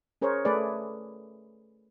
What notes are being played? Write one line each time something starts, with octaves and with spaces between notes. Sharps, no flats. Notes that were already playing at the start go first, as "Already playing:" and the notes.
C#4 G#4 A#4 C5 C#5
A3 G#4 B4 D5